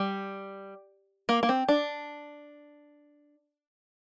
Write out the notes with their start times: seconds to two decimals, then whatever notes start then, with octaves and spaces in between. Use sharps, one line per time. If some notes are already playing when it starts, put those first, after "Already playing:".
Already playing: G3
1.29 A#3
1.43 A#3
1.49 C4
1.68 D4